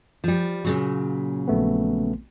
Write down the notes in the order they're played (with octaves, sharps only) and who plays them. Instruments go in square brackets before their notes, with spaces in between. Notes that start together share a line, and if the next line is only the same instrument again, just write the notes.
[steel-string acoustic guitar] F3 G3
A#2 C#3 F#3
[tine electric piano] A#1 A3 B3